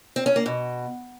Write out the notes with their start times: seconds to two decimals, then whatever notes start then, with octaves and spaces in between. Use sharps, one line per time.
0.16 C4
0.26 C#4
0.36 A#3
0.46 B2